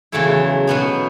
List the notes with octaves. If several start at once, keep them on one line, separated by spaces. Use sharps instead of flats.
E2 C#3 F#3 A3 E4
B2 F#3 B3 D#4